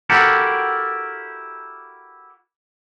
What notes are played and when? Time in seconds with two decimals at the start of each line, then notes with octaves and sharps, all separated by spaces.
0.10 E4 F#4 G4 A4 A#4